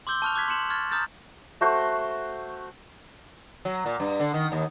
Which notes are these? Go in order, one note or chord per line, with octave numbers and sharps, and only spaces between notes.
C6 D6 E6 G6 G7
A5 C#6 F6 F#6 F7
D6 F#6 G#6 B6
C6 F#6 C#7 E7 F#7
C#6 F6 G#6 A6
A#5 D#6 F6 G6 A6
A3 F#4 C5
F#3
A#2
G2
D3
D#3
D#2